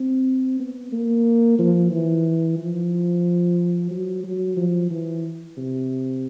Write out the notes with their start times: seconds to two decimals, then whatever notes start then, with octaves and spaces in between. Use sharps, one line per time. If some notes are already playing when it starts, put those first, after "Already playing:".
Already playing: C4
0.60 B3
0.92 A#3
1.59 F3
1.91 E3
2.58 F3
3.91 F#3
4.23 F#3
4.57 F3
4.90 E3
5.57 C3